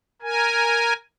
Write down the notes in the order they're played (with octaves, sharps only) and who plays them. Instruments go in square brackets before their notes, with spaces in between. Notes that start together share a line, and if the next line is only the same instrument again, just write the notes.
[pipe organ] A#4 G#5